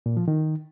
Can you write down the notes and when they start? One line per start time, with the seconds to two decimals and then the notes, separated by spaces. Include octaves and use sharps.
0.06 A#2
0.17 F3
0.28 D#3